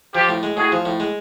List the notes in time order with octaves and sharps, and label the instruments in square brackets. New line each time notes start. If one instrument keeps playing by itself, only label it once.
[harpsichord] F3 [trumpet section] F4 G4
[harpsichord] A2
G#3
[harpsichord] A2 [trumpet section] F#4 G#4
[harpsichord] F3
A2
G#3